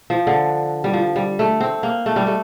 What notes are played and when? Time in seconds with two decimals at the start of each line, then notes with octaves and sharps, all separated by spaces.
0.10 F3
0.27 D3
0.84 G3
0.93 F3
1.16 G3
1.39 A3
1.61 C4
1.83 A#3
2.06 A3
2.16 G3
2.27 A3